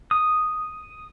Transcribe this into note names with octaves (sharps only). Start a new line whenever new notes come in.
D#6